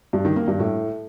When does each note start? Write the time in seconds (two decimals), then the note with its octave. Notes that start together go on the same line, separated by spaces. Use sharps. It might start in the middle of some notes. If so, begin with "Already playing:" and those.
0.13 G2
0.25 D#3
0.36 A#3
0.48 G2
0.59 A2